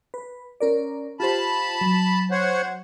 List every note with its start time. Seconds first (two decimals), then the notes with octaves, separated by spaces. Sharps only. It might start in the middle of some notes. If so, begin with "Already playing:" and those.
0.14 B4
0.60 C#4 A#4 D5
1.20 F4 G4 C5 A5 B5
1.81 F#3
2.31 C5 C#5 F#5